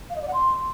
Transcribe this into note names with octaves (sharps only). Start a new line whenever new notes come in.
F5
D#5
D5
F#5
C6